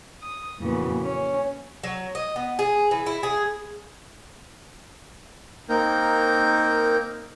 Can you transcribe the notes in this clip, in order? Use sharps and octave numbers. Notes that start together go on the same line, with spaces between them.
D#6
F2 A#2 C#3 E3 F#3 B3
C#4
F#3
D#5
B3
G#4
E3
E4
G#4
A#3 C4 D#4 A#4 G6